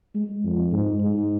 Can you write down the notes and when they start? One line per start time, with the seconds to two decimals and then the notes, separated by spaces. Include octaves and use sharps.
0.15 G#3
0.44 F2
0.72 G#2
1.00 G#2